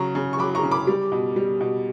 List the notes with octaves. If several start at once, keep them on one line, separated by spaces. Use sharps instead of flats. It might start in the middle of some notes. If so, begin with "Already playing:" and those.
Already playing: C#3 F#3 A#5 C#6
C#3
C#6
F#3 B5 D6
A#5 C#6
C#3
B5 D6
G3
B2
G3
B2